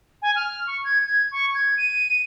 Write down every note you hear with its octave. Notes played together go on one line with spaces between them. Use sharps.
G#5
F6
C#6
G#6
G#6
C#6
G#6
D#7